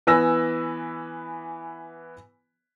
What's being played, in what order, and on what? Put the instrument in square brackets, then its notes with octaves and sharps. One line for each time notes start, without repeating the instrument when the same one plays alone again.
[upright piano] E3 B3 B4 G#5 E6 A#6